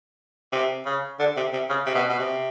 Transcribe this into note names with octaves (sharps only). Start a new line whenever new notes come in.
C3
C#3
D3
C3
C3
C#3
C3
B2
B2
C3